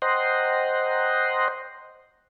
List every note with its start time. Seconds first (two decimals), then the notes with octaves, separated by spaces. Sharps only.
0.02 C5 D#5 F#5 G5 A#5 C6